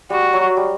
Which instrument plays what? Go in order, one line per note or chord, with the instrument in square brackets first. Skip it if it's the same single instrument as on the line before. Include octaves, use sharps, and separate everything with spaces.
[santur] G3 [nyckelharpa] F#4
[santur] F#3
G3